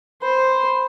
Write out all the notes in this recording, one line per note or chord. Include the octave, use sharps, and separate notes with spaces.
C5 B5